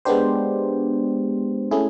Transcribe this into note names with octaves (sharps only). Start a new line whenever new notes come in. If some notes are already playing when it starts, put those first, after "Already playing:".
G#3 B3 D4 G4 C5
A3 C#4 E4 G#4